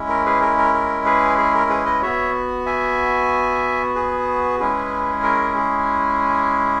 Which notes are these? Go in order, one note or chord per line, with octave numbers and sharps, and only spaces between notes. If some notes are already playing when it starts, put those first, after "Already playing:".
Already playing: G#3 C#4 E4
A#4
G#4 B4
A#4
A#4
A#4
G#4 B4
G#4
A#4
G#4 B4
B4 D#5
B3 F#4 C#5 E5
E5 G#5
G#4 B4
G#3 C#4 E4 G#4
A#4
G#4